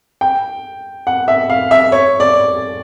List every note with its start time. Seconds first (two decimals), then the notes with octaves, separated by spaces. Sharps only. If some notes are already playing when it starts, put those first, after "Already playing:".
0.21 G5
1.07 F#5
1.28 E5
1.50 F5
1.71 E5
1.92 C#5
2.20 D5